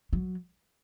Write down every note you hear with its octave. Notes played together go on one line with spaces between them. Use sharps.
F#3